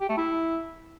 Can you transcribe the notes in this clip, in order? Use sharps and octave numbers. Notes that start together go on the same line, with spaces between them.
G4
A3
E4